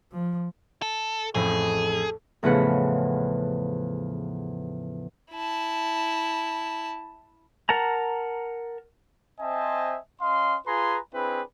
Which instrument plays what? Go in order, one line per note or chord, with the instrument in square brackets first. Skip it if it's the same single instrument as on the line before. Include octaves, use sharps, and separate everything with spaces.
[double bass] F3
[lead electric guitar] A4
[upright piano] A1 F2 A2 [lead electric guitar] G#4 [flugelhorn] A4
[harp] E2 A2 C#3 F3 B4 F#5
[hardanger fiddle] E4 A5
[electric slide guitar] A#4 F#5 A5 A#5
[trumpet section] C4 C5 D#5 E5 G#5 A5
C#4 D#5 F5 C6
F4 G#4 B4 G#5 A#5 C6
C4 D4 E4 G#4 B4